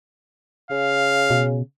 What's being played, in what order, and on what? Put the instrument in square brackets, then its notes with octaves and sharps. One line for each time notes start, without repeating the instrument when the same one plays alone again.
[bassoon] C#3 [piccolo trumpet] F5
[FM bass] B2